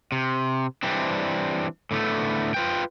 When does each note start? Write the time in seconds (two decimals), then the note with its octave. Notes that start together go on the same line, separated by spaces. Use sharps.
0.12 C3
0.83 E3 G3 C4 D4
1.91 A2 D3 A3 B3
2.54 F4 B4 G5